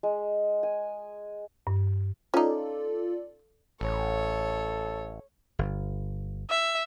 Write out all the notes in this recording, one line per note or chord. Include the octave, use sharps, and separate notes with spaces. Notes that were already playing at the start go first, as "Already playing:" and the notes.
G#3
G#5
G2
C#4 D#4 F4 A4 D5
A1 A4 C#5
G1
E5